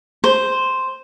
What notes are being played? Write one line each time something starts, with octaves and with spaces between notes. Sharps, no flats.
C5